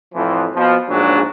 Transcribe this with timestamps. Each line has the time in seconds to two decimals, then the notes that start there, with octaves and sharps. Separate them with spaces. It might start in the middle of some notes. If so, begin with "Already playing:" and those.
0.15 F2 A2 E3 F3
0.55 B2 F3
0.89 A#1 G#2 F#3 D4 G#4